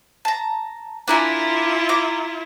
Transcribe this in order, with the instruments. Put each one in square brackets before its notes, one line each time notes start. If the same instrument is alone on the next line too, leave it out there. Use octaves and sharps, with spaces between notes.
[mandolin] A5 A#5
[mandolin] D4 A#4 G#5 [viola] E4 F4
[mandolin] A#5 D6